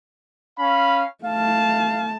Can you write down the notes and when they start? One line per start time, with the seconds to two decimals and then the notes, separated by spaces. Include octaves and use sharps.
0.57 C#4 F5 B5
1.25 A3 F5 A5